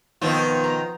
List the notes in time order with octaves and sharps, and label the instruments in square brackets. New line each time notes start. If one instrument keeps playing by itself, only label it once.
[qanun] B2 F3 C#5 [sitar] D#3 C4 F4
[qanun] A#5